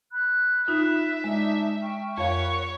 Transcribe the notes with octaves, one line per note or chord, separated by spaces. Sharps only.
B5 F#6
D#4 F4 E5
G#3 D4 D#4
G5 C#6 F6
F2 A#4 C#5 F5 F#5 B5 C#6